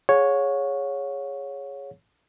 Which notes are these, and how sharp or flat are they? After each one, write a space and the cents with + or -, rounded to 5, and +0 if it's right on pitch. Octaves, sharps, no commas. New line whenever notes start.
G#4 +0 C#5 +0 F#5 -45